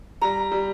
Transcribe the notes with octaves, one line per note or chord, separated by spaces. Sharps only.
G3 A#5
G3